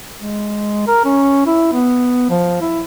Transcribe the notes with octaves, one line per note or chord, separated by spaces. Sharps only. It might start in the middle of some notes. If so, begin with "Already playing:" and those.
G#3
A#4
C#4
E4
B3
F3
E4